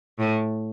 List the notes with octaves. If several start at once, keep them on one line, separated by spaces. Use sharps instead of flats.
A2